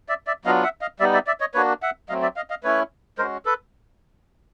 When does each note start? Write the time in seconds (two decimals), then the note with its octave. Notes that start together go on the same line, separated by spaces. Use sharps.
0.09 D5 E5
0.27 D5 E5
0.45 F#3 B3 D4 F4 D#5 F5
0.63 E5 F#5
0.81 D#5 F5
1.00 G3 B3 D#4 D5 E5
1.13 D5 E5
1.27 D5 E5
1.40 C#5 D#5
1.54 A#3 D4 F#4 B4 C#5
1.82 E5 F#5
2.09 F#3 A3 C4 D#5 F5
2.22 D5 E5
2.36 D#5 F5
2.50 D#5 F5
2.63 A3 C#4 E4 B4 C#5
3.18 G#3 C#4 F#4 A#4 C5
3.45 A4 B4